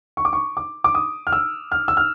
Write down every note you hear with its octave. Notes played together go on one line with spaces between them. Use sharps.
C#6
D6
C#6
D6
D6
D#6
F6
E6
F6
E6
F6